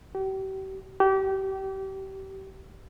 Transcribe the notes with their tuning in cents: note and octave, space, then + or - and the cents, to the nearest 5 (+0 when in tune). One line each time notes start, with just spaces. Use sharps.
G4 -40
G4 -30